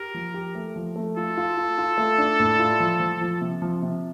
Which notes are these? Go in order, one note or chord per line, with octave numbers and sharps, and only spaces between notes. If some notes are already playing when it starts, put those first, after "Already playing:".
Already playing: G4 A#4
F3
G4
A3
F3
A3
F4 A4
F4
F4
F4
A3
D4
A2
F4
F3
F3
F3
C3
F3
C3